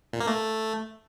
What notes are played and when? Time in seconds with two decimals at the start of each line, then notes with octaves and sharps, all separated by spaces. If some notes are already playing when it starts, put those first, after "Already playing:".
0.13 A#2
0.20 A#3
0.27 A3